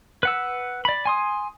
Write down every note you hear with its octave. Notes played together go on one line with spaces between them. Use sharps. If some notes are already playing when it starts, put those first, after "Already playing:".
B4 F#5 E6
D5 B5
G#5 C6 D#6